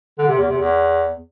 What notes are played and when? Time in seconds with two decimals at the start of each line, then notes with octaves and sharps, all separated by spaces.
0.19 D3
0.28 C3
0.38 E2
0.48 C3
0.58 E2